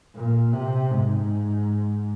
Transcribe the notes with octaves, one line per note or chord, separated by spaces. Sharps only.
A#2
C3
G#2